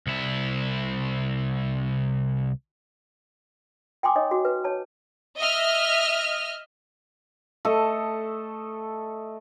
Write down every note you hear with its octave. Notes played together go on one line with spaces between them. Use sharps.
C2 E4
G5 G#5 C6 D6 D#6
D#4 C#5 D#5 C#6 D#6
F#4 D6
B4
C#5 A5
D#5 E5 F6
A3 A4 D#5